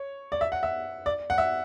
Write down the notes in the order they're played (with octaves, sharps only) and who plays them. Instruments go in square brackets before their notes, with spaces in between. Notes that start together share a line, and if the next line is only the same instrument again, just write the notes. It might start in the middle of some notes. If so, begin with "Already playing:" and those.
Already playing: [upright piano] C#5
D5
E5
F#5
E5
D5
F#5
E5